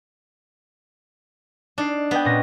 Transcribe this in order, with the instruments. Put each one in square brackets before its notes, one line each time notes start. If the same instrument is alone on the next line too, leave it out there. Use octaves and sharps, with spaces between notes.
[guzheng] D4 [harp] D#4 C7
[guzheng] B3 [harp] B4 D#5 G5
[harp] A#2 C#4 A#6